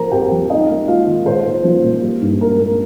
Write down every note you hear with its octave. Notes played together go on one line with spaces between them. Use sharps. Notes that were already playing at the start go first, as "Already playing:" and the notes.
Already playing: F3 A#3 A#4 C5 A#5
F2 G4 G5
F3
A#3 D#4 D#5
A#3
A#3 F4 F5
D#3
A#2 C5
A#2
F3
A#2
G3
G2
A#3 A#4
A#3